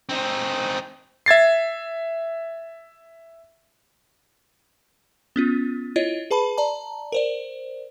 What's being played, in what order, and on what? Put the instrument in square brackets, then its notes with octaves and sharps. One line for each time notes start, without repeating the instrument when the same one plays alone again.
[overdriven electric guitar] C4 D#4
[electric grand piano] E5 G#6 A6 C7
[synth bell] B3 C#4 F4
E4 F4 C#5 D#5
G#4 B4 A5 B5
D5 A5 A#5
A#4 C5 D5